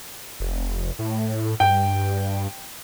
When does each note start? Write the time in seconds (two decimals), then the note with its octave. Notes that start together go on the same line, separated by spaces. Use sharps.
0.40 F1
0.99 A2
1.60 G2 G5